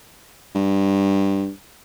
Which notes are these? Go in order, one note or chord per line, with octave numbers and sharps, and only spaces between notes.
G2